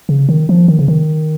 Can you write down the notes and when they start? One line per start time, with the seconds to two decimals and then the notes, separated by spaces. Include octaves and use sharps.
0.09 C#3
0.29 D#3
0.49 F3
0.68 D#3
0.79 C#3
0.88 D#3